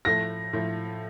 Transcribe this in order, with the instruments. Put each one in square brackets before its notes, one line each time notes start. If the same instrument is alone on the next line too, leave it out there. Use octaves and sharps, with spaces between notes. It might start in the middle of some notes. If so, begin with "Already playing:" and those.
[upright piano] A2 F3 A3 [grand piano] A#6
[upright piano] A2 F3 A3